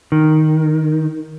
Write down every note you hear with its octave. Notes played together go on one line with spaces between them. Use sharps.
D#3